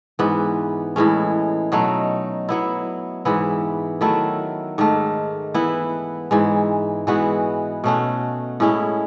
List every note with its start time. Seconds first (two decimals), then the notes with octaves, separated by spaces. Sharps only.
0.19 G#2 E3 B3
0.96 A2 E3 G#3 C#4
1.72 B2 F#3 A3 D#4
2.49 F#3 B3 E4
3.25 G#2 E3 B3 E4
4.01 D#3 F#3 A3 E4
4.78 G#2 D#3 A3
5.54 E3 B3 E4
6.31 G#2 E3 G#3
7.07 E3 G#3 B3 F#4
7.84 B2 A3 C#4 F#4
8.60 A2 G#3 C#4 E4